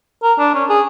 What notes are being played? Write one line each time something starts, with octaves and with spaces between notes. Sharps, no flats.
A#4
D4
C#4
G#4